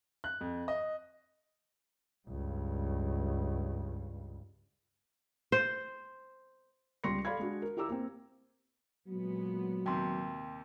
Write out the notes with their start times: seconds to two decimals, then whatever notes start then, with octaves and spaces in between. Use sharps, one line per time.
0.24 F#6
0.41 F2
0.68 D#5
2.28 C#2 G2
5.52 C5
7.04 C#2 G3 C6 C#6 A#6 C#7
7.25 A4 D5 F5 B5 C6 G#6
7.39 G#3 D4 F#4
7.62 A#4
7.77 E4 G4 A#5 D6 E6
7.89 A#3 C4
9.07 A#2 F#3 G#3 B3
9.86 D#2 C3 G5 C6